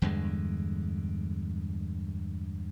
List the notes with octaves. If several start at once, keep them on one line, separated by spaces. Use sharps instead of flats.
E2 G2 D3 G#3